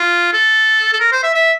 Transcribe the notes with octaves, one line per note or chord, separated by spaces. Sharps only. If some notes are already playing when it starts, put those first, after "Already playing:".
Already playing: F4
A4
A4
A#4
C5
E5
E5